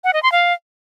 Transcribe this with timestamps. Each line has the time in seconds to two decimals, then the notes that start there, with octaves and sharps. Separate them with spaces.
0.04 F#5
0.13 D#5
0.23 C6
0.32 F5